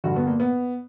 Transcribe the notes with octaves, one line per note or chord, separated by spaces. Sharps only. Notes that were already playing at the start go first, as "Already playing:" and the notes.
G2 D3 F#4
B3
A#3
B3